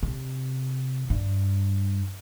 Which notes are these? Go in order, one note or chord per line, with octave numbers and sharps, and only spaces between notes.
C3
G2